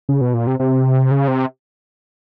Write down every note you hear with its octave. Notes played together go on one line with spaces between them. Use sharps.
C#3
B2
A#2
C3
C3
C#3
C3